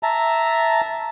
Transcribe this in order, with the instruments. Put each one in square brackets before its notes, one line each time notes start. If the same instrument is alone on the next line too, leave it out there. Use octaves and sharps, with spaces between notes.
[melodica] E5 A5 A#5